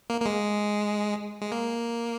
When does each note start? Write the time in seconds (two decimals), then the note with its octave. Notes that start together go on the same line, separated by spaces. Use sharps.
0.10 A#3
0.21 A#3
0.26 G#3
1.42 G#3
1.52 A#3